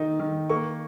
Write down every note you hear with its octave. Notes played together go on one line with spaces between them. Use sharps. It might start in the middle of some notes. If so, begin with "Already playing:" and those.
Already playing: D#3 D#4
D#3
A#3 C#6